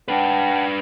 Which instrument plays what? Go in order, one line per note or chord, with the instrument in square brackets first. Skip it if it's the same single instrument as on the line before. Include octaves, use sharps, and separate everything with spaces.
[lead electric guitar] D4 B4 [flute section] F#5 G5 A5